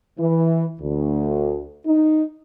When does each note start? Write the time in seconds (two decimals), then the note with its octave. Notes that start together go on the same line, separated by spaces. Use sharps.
0.19 E3
0.80 D2
1.86 D#4